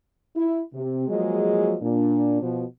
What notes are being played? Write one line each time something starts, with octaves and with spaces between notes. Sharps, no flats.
E4
C3
F3 F#3 G#3 A#3 G#4 D#5
A#2 D4
B2 F3